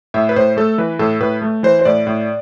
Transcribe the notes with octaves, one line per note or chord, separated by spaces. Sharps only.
A2 E5
B4
A2 C5
A3 A4
E3 B4
A2 A4
A2 B4
A3
E3 C5
C5
A2 D5
A2